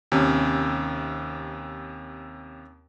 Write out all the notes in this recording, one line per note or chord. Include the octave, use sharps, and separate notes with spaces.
D#2 C3 C#4